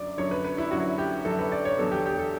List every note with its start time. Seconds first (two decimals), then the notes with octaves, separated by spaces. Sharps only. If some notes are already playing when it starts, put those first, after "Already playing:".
Already playing: F#2 D3 F#3 D5
0.18 F#2 D3 F#3 C#5
0.31 B4
0.44 B4
0.58 E4
0.71 F#2 D3 F#3 F#4
0.98 G4
1.25 F#2 D3 F#3 A4
1.39 B4
1.52 D5
1.65 C#5
1.78 E2 D3 F#3 B3 A4
1.91 G4
2.06 G4
2.19 A4